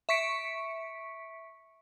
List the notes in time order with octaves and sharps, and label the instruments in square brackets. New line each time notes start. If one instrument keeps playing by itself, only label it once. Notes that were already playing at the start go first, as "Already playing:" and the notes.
[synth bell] E5 C#6 B6 C#7 D7